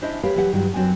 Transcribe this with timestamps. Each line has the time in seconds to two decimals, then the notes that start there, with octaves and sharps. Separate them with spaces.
0.02 C#4 D4 E4 C5 D#5
0.23 G4 A#4 B4 C#5 F5
0.36 E3 F#3 G4 F#5
0.52 G2 D#3 F#3 G3 F4
0.74 F#2 F#3 C4 B4 G#5